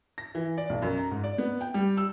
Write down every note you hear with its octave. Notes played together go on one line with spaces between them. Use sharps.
A#6
E3
D5
B1
F#2
A#5
G#2
D5
B3
G5
G3
E6